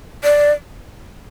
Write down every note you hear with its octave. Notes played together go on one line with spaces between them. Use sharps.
D5